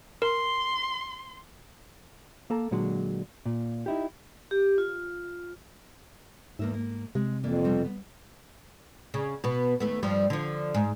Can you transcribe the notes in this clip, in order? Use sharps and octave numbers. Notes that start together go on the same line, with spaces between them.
A#4 C6
A#3 A4 A#5
A#2 D3 F#3 G#3
A#2
D#4 E4 G4
G4
F4
E2 G#2 A#3 E5
A#3
C3 G#3
F2 E3 A#3 D5
B2 G3 C4
B3
C#3
B2 B3
D#2 A3 B3
G2 F3 G3
D3 F3
G#2